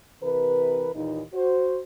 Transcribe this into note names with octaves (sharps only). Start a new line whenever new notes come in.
C3 E3 A#4 B4
D#2 A#2 E3 D#4
F#4 C5